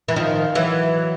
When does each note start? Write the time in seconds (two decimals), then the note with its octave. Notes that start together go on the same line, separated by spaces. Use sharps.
0.08 E3
0.16 D#3 F3
0.55 E3 F#3